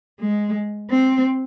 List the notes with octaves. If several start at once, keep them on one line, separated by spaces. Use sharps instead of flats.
G#3
C4